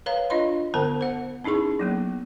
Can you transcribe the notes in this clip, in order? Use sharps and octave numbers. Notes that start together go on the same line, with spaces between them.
B4 C#5 F5 A#5
D4 F4 D#5 B5 C6
D3 B3 A#4 C5 A5
C5 F#5
C#4 D#4 E4 G#4 C#6
F#3 A#3 B3